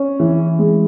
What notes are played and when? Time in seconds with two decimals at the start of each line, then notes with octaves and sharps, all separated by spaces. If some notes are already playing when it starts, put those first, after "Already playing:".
Already playing: C#4
0.20 E3
0.59 G#3